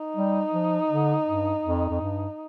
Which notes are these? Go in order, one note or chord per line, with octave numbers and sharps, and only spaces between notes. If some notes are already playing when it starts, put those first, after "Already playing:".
Already playing: D#4
G3
F3
D3
G2
F2
F2
G2